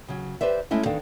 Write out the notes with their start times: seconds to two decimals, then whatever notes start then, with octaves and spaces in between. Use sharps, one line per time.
0.08 C#3 F#3
0.41 G4 B4 C5 D5 E5
0.71 G#3 A3 C#4 E4 D#5
0.86 E2 D#3 D4 A4 F5